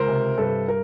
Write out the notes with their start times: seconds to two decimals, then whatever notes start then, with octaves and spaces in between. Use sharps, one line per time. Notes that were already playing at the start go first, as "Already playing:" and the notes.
Already playing: C#2 A#4 C5
0.08 C3
0.38 G2 A4 B4
0.68 A#4